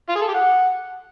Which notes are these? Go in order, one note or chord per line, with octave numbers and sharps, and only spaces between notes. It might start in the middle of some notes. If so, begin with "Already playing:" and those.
F4
G#4
A4
G4
F#5